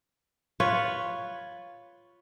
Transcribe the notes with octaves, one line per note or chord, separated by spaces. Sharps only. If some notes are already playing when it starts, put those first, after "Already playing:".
F4 B4 C#5